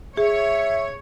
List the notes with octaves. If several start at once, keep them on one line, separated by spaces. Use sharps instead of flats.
G#4 C#5 E5